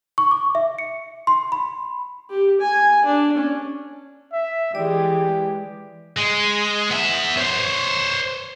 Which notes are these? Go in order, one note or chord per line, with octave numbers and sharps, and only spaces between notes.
C#6
D6
E5
C#7
C6
B5
G4
G#5
D4
C#4
E5
E3 G#3 G4 D5
G#3
B3 E5
C5 C#5